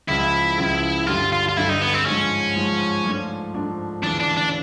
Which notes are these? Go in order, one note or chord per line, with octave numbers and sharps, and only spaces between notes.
C#2 C#3 F3 E4
C#2 C#3 F3
G2 D3 G3 F4
F4
F4
G2 D3 G3 E4
D#4
B3
C4
G#2 F3 G#3 C#4
G#2 F3 G#3
G#2 F3 A3 D4
G#2 F3 A3 D4
D2 C#3 E3 D4
D4
D4